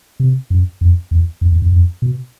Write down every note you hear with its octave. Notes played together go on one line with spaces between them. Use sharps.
C3
F#2
F2
E2
F2
E2
F2
F2
B2